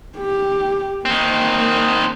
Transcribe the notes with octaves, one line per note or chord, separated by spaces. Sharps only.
G4
D#3 A#3 C4